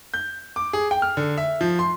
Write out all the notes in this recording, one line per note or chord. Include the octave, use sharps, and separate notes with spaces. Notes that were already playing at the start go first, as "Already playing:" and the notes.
G6
D6
G#4
G5
F6
D3
E5
F3
C6